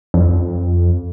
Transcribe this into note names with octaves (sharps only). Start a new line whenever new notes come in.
F2